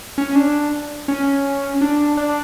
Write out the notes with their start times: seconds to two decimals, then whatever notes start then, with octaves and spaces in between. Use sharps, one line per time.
0.18 C#4
0.35 D4
1.08 C#4
1.81 D4
2.17 D4